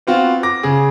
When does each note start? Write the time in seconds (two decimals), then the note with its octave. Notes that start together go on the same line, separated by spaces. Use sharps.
0.07 B3 C4 F4 F#4
0.43 D6 A#6
0.63 C#3 G#4